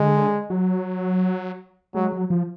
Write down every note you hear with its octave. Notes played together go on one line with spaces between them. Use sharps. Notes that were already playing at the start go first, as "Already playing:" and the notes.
Already playing: D3 G#3
F#3
F#3 G#3
F#3
F3